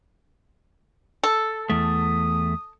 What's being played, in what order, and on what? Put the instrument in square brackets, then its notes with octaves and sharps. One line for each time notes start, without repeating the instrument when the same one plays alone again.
[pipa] A4
[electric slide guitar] E2 A3 [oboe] D#6